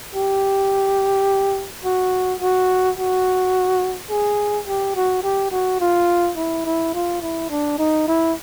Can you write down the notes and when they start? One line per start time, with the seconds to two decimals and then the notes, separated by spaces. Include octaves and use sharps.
0.15 G4
1.84 F#4
2.41 F#4
2.97 F#4
4.10 G#4
4.67 G4
4.95 F#4
5.23 G4
5.52 F#4
5.81 F4
6.37 E4
6.65 E4
6.94 F4
7.22 E4
7.50 D4
7.78 D#4
8.08 E4